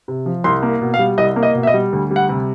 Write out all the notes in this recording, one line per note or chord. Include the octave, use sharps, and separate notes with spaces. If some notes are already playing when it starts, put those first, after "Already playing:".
C3
F3
C2 C6
A#3
B2
F5
G3
C2 D#5
A#3
D#5
B2
E5
D#5
G3
D2
G3
F#5
C3